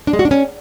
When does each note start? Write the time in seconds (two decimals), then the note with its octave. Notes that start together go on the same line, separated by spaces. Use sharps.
0.07 D4
0.13 G#3
0.19 F#4
0.25 D4
0.31 C#4